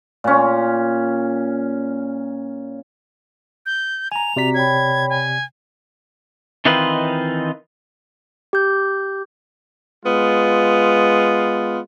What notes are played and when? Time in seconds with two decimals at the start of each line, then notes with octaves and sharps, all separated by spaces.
0.24 A#2 C#4
3.66 G6
4.12 G#5 A#5 F7
4.36 C3 C4 F#4 D5 A#5 B6
4.54 C#5 G5 B5 G#6
5.09 G#5
6.65 D#3 E3 C4 D#4 F4 B4
8.53 G4 G6
10.06 G#3 B3 F4